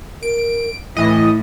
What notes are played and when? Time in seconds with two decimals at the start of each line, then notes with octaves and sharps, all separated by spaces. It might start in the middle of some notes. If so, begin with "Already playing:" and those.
0.23 A#4 D7
0.97 A2 E3 E4 D#5